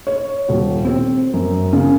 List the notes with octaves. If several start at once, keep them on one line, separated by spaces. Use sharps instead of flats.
C#5
D#1
C4
F#2
C#3